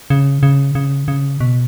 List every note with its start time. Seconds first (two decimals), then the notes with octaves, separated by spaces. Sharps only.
0.10 C#3
0.43 C#3
0.75 C#3
1.08 C#3
1.41 B2